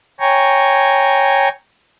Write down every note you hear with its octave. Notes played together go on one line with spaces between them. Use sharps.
C#5 G5 G#5 A#5 C#6